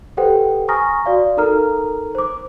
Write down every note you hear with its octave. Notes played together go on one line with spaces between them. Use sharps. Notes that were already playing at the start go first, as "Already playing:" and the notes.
G4 A4 B4 C5 F#5 G5
G#5 A#5 C#6 D#6 F6 A#6
F#4 D5 F5
D#4 A4 A#4 A#5 F6
C5 D6